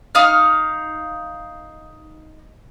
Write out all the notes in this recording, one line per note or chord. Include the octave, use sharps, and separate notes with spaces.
D#4 F5 F6